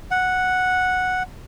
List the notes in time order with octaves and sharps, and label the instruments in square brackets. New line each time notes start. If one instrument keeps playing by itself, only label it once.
[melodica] F#5